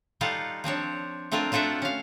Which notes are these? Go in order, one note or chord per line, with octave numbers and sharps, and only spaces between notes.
G3 D#4 F4 A4 F5 F#5
F3 C4 D4 C#5
A3 C4 D4 F4 A#4
D4 F4 F#4 A4 E5
C#4 F5